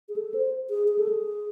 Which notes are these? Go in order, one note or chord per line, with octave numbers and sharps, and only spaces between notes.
G#4
A4
C5
G#4
G#4
A4
G#4